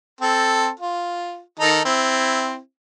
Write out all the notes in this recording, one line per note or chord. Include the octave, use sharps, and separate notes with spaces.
C4 A4
F4
D#3 D#4 A4
C4 E4